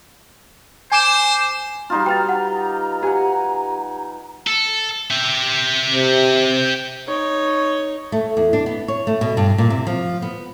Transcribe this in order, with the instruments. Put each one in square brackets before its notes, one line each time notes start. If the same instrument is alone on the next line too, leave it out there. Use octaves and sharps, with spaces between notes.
[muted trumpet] C5 [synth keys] G#5 D6 E7
[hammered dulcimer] G3 D#4 F4 [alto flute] A#5
[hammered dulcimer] B4 F5 [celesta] G5 A6
[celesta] F#5
[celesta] G4 [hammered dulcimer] F#5 G#5
[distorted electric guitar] A4
G4 E5
[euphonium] C3
[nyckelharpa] D#4 C#5
[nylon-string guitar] A3
E2
D4
B3
C#5
A3
B2
G2
A#2
C3
F3
B3